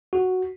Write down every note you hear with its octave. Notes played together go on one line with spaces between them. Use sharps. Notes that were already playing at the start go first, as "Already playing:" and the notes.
F#4